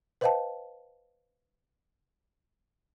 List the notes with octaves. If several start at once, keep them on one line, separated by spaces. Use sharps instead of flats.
B4 C5 D#5 F5 G5 A5